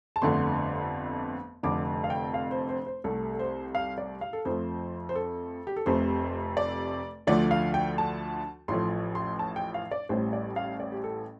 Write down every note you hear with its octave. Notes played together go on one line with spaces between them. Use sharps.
A5
G1 F2 D3 A3 C6
F1 F2 D3 D6
F5
G5
F5
C5
C5
C5
C2 C3 A3 A4
A4
C5
F5
D5
F5
A4
F2 F3 A3 C5
C5
A4
G4
A4
F1 F2 C3 A3 C5
D5
D2 D3 F3 A3 D5
F5
G5
A5
A1 A2 F3 A3 C6
C6
A5
G5
F5
D5
A1 A2 G3 C5
D5
F5
D5
G4
A4